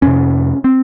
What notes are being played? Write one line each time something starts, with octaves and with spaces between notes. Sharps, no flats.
F2 C3 C#4
C4